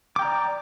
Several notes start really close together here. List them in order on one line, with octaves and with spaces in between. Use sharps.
D6 G5 A#5 D5